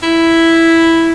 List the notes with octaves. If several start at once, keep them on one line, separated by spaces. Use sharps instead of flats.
E4